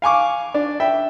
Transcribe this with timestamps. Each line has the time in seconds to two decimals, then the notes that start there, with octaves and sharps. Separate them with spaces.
0.02 F5 G#5 C#6 D6
0.54 D4
0.80 E5 G5